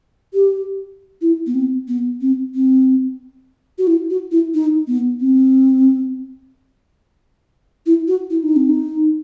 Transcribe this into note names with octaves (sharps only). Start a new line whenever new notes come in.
G4
E4
B3
C4
B3
C4
C4
F#4
E4
F#4
E4
D#4
B3
C4
E4
F#4
E4
D#4
C4
D#4